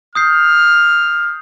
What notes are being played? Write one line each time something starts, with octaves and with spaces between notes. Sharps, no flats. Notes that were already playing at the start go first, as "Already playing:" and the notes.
D#6 F6 G6 C7